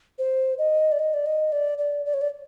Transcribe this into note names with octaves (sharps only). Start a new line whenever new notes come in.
C5
D#5
D5
D#5
D5
D#5
D5
D5
D5
C#5
D5